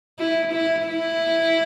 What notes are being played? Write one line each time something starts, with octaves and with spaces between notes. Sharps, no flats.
E4
E4
E4